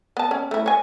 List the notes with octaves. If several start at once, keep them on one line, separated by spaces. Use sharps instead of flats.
B3 A5
C#4
A3 E4
C#5 G#5